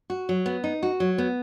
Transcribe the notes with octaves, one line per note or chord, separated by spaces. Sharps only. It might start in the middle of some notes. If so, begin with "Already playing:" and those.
F#4
F#3
B3
D#4
F#4
F#3
B3